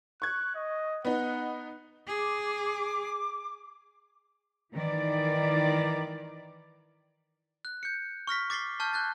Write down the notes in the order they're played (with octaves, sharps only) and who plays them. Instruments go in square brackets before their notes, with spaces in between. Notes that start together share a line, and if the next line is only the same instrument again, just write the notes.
[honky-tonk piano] C#6 G#6 [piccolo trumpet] F#6
[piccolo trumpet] D#5
[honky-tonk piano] B3 D#4 [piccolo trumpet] F#5
[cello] G#4 [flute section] D6
[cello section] D#3 E3 D5
[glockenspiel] F#6
G6 C#7
C#6 F6 A#6 B6
D6 A6 B6 C7 G7
A5 C#6 F6 G6
F#6 G6 A6